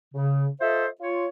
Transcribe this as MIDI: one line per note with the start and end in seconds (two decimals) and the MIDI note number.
0.14 0.48 49
0.61 0.87 65
0.61 0.87 69
0.61 0.87 72
0.61 0.87 75
0.61 0.87 76
1.01 1.27 65
1.01 1.27 73